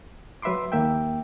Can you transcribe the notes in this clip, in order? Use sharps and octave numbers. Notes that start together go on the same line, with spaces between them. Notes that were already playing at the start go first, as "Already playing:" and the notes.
F#3 B4 E5 B5 C6 D6
D#2 A#3 E5 G5